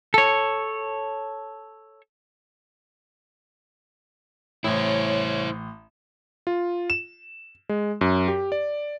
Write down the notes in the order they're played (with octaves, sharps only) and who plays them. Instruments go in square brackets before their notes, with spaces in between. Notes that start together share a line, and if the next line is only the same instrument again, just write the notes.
[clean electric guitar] A4 C#5
[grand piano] A1 [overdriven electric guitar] E4 C5 [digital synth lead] C#5
[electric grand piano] F4
E7
G#3
F#2
G4
D5